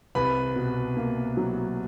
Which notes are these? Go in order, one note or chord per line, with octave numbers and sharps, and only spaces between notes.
C2 B4 B5
B2
A#3
F#3